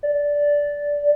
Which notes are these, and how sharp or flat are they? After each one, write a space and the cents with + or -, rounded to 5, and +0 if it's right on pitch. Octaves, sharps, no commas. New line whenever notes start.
D5 -10